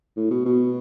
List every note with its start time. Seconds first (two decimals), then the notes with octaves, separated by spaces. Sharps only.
0.17 A2
0.31 B2
0.46 B2